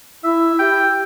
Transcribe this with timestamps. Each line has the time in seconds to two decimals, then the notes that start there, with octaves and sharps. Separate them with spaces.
0.24 E4 E5
0.59 G4 G5